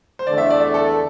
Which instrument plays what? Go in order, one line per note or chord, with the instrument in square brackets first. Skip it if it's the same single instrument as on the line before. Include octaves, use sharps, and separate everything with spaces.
[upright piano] C5
[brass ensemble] E2 D3 A3 D4 [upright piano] D5
[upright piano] E5
D5
A4